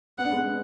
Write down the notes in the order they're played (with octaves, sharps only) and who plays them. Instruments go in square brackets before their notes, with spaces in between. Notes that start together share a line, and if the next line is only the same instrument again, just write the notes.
[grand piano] B3 [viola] F#5
[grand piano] D4
G#3 B3